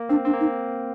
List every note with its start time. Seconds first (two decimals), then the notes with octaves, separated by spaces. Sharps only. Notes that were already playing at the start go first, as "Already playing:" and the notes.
Already playing: A#3
0.09 C4 D4
0.25 C4 D4
0.34 A#3
0.40 D#4